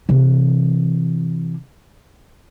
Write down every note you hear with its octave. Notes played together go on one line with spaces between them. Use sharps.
C3 E3